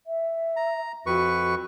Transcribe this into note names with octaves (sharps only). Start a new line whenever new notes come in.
E5
A#5
F2 F#4 B4 C#6